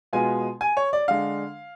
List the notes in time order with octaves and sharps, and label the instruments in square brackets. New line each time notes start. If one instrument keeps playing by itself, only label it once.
[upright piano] B2 G#3 B3 F4 G#5
G#5
C#5
D5
D3 G#3 D4 F5